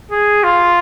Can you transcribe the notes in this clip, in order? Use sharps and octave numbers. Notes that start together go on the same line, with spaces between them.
G#4
F4